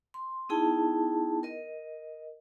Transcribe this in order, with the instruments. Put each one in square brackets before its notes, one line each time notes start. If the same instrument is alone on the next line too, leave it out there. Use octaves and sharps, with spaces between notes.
[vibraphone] C6
B3 D#4 E4 G#4 G5 A5
A#4 D#5